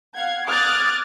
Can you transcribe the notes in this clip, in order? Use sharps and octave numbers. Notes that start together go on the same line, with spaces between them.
F5 F#5 G#6
D6 D#6 F6 F#6 G#6 A6